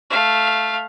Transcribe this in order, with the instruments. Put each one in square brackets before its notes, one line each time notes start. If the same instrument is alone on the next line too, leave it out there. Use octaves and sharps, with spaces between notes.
[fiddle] A3 F5